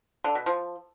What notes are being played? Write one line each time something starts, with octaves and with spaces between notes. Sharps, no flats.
D3
B2
F3